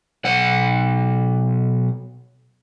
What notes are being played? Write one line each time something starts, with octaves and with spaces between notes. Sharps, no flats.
B1 F#5